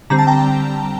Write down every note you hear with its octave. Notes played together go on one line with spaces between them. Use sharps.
D3 G3 C4 A#5
A5
G5 A#5